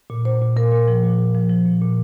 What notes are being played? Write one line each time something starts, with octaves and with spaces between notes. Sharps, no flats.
A#2
A#2 C5
A#2
A#2 A#4
A#2
F3
A#2
A#2
F3
F3
A#2
A#2